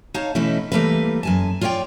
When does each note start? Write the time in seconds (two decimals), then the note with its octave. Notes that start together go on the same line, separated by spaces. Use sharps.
0.14 D#4 C#5 F5 A5
0.35 B2 E3 A3 C#4 D#4 E4
0.72 E3 G3 A3 A#3 A#4 B4
1.23 F#2 G#5 A5
1.61 F4 C#5 D5 E5 G5